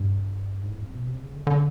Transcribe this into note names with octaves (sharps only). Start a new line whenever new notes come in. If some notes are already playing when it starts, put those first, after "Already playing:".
Already playing: G2
G#2
A2
F2
B2
C3
C#3
D3
D3